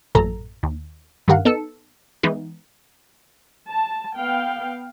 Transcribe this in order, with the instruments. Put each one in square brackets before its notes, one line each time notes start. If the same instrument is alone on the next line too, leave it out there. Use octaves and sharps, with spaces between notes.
[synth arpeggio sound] A1 F#2 A#2 A4 A#5
D#2
G2 D#3 G4 A#4 F5 F#5
B3 D#4 A4 A5 E6 C#7
E3 G#3 B3 D#4
[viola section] A5
B3 F5 G5